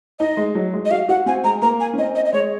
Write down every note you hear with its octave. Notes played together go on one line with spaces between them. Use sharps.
D#4 D#5
G#3
F#3
G#3
D#5
F#4 F5
F#4 F#5
C4 G#5
G#3 A#5
A#3 A#5
G#5
C#4
C4 D#5
D#5
D#5
G#3 C#5